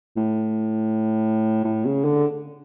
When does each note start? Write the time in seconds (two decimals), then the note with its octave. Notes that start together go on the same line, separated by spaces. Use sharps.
0.17 A2
1.64 A2
1.85 C#3
2.05 D3